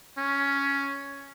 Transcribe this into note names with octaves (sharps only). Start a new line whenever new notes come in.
C#4